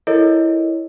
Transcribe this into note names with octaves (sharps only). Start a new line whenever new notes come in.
E4 A4 A#4 C#5 D#5